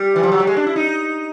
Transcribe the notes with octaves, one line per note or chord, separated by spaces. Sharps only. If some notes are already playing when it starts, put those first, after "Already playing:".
Already playing: G3
E3
F3
F#3
G3
G#3
D4
E4
D#4